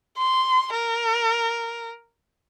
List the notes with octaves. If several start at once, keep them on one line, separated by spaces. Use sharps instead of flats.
C6
A#4